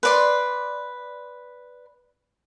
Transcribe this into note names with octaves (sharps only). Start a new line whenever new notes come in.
B4 D5 C6